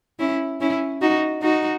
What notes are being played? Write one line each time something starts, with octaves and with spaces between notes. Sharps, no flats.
C#4 E4
C#4 E4
D#4 F#4
D#4 F#4